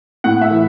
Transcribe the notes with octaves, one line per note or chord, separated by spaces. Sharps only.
A2 F#5
E5
E3